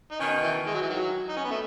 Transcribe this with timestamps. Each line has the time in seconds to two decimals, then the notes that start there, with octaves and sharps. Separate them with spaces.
0.12 D#4
0.19 B2 D#3 C#4
0.43 E3
0.67 G#3
0.74 F#3
0.81 E3
0.90 D#3 F#3
1.29 D#4
1.37 C#4
1.44 B3
1.51 A3